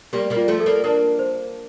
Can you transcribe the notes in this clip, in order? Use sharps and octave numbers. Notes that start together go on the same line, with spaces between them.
G3 A#3 G4
G3 A#3
F4
F3 A3
A4
G3 A#3
A#3 D4 A#4
C5